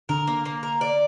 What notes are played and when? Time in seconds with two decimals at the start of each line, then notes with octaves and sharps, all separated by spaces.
0.09 D3 A#4
0.27 A#3
0.45 A#3
0.63 A#4
0.81 D5